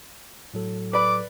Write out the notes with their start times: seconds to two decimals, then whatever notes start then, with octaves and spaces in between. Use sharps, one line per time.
0.54 A2 F#3 A4
0.93 B4 D5 B5 D6